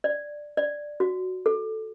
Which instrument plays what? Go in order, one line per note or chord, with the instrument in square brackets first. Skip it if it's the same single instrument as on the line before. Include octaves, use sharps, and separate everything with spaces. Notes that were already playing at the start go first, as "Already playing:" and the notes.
[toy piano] D5
D5
F#4
A4